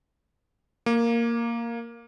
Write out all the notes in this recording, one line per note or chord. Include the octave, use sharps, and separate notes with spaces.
A#3